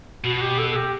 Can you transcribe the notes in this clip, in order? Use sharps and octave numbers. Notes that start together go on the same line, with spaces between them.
B2 F#4
F#4
G4
A4
A4
G4